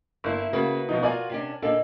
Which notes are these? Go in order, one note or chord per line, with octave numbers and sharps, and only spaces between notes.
G1 A#3 E4
C#3 A#3 F#4 B4
B2 F3 D#4
F4 F#4 A#4 D5 G#5
C3 C#4 D4
A#2 D3 A#3 D4 D#4 A4